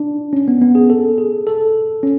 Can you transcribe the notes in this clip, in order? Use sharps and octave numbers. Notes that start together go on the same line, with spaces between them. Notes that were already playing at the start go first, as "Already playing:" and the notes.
Already playing: D4
C#4
B3
B3
G#4
A4
G#4
A4
C#4